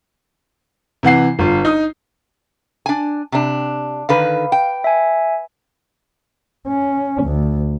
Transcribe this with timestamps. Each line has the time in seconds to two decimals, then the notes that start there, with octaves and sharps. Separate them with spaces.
1.03 C3 E3 F#5 C7
1.39 G1 F4
1.65 D#4 D#6
2.86 D4 G#5
3.32 C3 D4
4.09 D3 D#3 B4 F5
4.52 G5
4.84 E5 G#5
6.68 C#4
7.23 D2